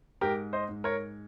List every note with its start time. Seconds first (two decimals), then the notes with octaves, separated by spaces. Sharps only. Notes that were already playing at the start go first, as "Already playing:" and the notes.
0.21 G#2 G4 A#4
0.53 C5 D#5
0.69 G#2
0.84 A#4 C#5